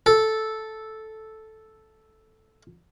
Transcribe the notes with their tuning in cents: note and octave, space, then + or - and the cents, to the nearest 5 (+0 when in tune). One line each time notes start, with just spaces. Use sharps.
A4 -5